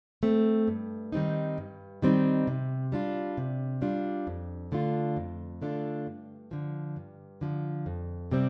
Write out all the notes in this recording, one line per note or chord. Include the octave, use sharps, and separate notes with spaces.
A3 C4
G2
D#3 G3 C4 D#4
G2
D#3 G3 C4 D#4
C3
G3 D4 F4
C3
G3 D4 F4
F2
D3 A3 D4 F4
F2
D3 A3 D4 F4
G2
D3 F3
G2
D3 F3
F2
C3 G3 C4